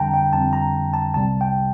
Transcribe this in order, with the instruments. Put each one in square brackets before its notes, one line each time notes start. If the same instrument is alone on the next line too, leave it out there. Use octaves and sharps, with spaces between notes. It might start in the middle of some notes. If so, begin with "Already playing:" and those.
Already playing: [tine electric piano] F2 D3 G3 G5 A5 A#5
G5
F2 D3 G3 A5
A#5
A5
C2 C3 G3 A5
G5